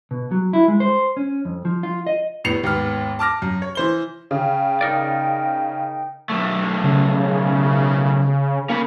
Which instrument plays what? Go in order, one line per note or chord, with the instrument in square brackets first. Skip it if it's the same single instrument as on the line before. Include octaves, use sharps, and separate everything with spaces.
[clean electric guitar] B2
F#3
E4
G#3
C5
C#4
F2
F3
F4
D#5
[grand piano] F1 A2 B3 C7 C#7 F7
D#2 G#2 B3 F6
A5 D6 F6 A#6
F#2
C#5
E3 C5 G7
[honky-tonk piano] C#3 [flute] G5
[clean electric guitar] D#4 A#4 D5
[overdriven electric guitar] B1 A3
[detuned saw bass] C#3
[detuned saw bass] A#3 [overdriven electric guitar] C#4 B5